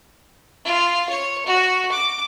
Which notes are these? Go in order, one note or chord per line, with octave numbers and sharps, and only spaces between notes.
F4
C#5
F#4
D6